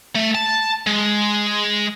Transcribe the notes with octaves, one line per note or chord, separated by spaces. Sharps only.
A3
A5
G#3